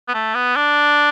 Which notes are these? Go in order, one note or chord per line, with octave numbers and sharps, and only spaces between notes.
B3
A3
B3
D4